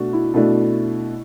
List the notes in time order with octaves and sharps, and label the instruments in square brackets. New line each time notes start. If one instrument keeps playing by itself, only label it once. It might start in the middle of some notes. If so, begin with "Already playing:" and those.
Already playing: [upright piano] B2 A3 D4 [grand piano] F#4
[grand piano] E4
[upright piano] B2 A3 D4 [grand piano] E4